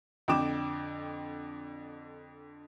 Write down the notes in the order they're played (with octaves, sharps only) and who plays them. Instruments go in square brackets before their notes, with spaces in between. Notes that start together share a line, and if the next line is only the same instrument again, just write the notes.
[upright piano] F2 D3 G5 D6 E7